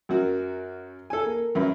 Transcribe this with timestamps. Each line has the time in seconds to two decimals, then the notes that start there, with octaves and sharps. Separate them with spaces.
0.09 F#2 F#4 A#4
1.10 A4 G#5
1.25 A#3
1.55 F#2 E4 B4